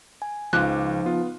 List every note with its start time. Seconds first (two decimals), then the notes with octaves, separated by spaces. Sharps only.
0.22 G#5
0.53 C#2 F3 D#4 F5 D6 F#6
1.05 B3 F4